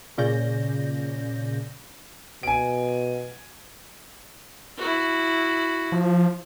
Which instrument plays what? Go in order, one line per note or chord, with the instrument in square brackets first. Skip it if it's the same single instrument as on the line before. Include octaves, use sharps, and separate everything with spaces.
[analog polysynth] A#2 C#3 C#4 D5 G6 A#6
[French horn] B2 [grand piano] G#5 D7
[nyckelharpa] E4 F#4
[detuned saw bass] F3